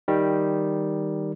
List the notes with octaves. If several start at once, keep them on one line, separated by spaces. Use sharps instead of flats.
D#3 G3